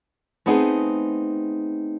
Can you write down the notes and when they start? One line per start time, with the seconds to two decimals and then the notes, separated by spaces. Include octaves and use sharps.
0.46 A3 B3 C4 D#4 G#4